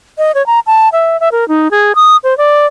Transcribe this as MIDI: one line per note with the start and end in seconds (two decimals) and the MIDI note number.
0.18 0.32 75
0.35 0.45 73
0.46 0.60 82
0.67 0.89 81
0.92 1.19 76
1.20 1.29 76
1.32 1.47 70
1.48 1.71 63
1.71 1.92 68
1.96 2.16 87
2.24 2.37 72
2.38 2.66 74